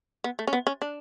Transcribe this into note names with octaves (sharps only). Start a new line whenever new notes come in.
B3
A3
C#4
B3
C#4
D4